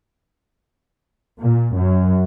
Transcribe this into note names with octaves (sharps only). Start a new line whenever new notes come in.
A#2
F#2